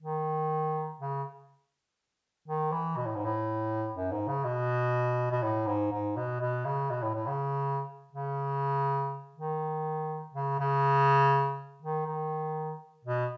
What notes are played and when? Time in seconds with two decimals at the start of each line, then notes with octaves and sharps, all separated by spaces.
0.02 D#3
1.00 C#3
2.48 D#3
2.72 E3
2.97 B2
3.06 A2
3.16 G#2
3.25 A2
3.95 F#2
4.12 G#2
4.28 C#3
4.44 B2
5.31 B2
5.43 A2
5.67 G#2
5.92 G#2
6.17 B2
6.40 B2
6.65 C#3
6.90 B2
7.02 A2
7.15 A2
7.27 C#3
8.13 C#3
9.36 D#3
10.34 C#3
10.59 C#3
11.82 D#3
12.07 D#3
13.05 B2